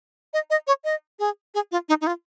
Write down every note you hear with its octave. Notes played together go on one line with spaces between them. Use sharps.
D#5
D#5
C#5
D#5
G#4
G#4
F4
D#4
D#4
F4